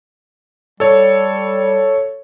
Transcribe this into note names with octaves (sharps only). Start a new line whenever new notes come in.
G3 A4 C#5